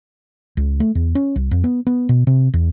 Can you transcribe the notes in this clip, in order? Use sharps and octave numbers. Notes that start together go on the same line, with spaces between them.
C#2
A3
E2
C#4
C2
F2
B3
B3
B2
C3
E2